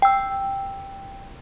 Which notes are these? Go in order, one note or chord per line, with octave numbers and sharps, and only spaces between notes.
G5 E6